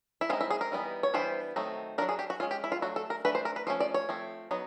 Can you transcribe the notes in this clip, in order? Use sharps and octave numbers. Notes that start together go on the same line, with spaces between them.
E4
G#3 C4 D#4 F4
E4
G#4
A#4
E3 G3 B3 D#4
C#5
E3 G3 B3 D4 C5
D#3 F#3 A3 C4 D#4
F#3 A3 D4 A#4
G#4
G4
F#4
G#3 C#4 F4
G4
E4
F4
F#3 A3 D4 F#4
A4
A#4
E3 A3 D4 B4
C5
A#4
B4
F3 A3 C#4 C5
D5
C#5
F3 A3 C4
F#3 B3 D#4